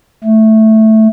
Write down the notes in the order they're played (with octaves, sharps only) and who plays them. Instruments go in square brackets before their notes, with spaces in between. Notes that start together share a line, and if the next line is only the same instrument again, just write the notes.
[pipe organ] A3